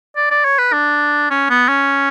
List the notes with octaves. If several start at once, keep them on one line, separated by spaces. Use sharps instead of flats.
D5
D5
C#5
B4
D4
C#4
B3
C#4